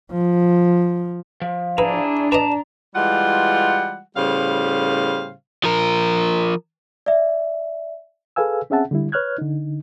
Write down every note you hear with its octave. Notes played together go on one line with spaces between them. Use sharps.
F3
F3
D4 E4 G#4 B4 A#5
B4 D5 D#5 A5 A#5
E3 G3 G#3 F4 F#5
A2 C#3 G3 B3 C5 F5
F3 A#4
D5 E5
G#4 A4 B4 F5 G#5 E6
C4 C#4 G#4 E5 F#5 A5
D3 G3 E4
B4 C#5 F6 F#6 G#6
D3 D#4